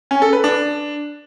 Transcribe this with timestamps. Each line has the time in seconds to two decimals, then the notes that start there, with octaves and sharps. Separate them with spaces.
0.11 C#4
0.22 A4
0.33 B4
0.44 D4